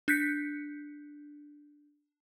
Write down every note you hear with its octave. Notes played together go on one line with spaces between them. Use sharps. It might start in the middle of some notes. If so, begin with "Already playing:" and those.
D4 F#6 G6 B6 C#7